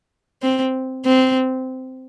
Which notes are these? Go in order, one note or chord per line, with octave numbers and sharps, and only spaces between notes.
C4
C4